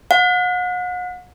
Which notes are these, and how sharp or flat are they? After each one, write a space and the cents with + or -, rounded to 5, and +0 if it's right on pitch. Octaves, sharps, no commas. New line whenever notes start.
F#5 -40